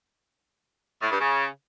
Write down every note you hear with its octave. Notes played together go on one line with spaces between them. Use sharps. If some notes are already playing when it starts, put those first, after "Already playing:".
A2
G2
C#3